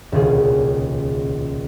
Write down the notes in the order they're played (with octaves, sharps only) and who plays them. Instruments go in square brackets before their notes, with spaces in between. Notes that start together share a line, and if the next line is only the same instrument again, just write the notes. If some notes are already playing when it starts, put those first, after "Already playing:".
[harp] D#1 C#2 B2 G#4